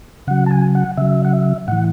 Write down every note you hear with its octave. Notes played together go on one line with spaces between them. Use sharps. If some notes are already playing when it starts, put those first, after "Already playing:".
C#3 F#3 F#5
A5
G#5
F#5
C#3 F#3 E5
F#5
E5
A2 E3 F#5